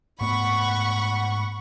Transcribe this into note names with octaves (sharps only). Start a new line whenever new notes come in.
G#2 A3 B3 F#5 B5 C#6